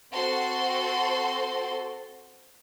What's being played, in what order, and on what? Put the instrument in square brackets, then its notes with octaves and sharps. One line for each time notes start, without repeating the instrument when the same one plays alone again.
[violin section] C4 F#4 A4 C5 C6